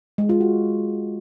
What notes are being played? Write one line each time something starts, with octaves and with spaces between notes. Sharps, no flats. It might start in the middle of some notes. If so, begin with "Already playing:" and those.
G#3
F4
F#4